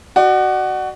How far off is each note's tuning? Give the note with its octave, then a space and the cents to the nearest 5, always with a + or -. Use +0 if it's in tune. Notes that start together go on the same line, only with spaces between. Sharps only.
F#4 +15 D5 +40